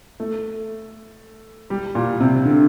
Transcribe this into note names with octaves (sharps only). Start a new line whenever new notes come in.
A3
G3
A#2
C3
D3